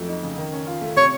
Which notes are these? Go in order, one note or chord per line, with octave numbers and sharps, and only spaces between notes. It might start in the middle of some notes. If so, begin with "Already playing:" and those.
Already playing: F2 F#3 A3
D#4
C#3
D#3
C#4
F4
A3
C3 C#5